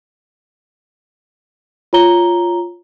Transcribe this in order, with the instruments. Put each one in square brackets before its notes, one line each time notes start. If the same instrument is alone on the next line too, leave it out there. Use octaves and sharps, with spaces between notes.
[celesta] F4 C#5 A#5 G7